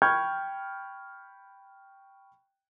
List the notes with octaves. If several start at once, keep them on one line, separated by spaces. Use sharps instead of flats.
G5 B5 C#6 F6 G6 G#6